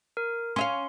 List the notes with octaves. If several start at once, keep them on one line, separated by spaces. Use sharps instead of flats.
A#4
C#4 E5 F5 C6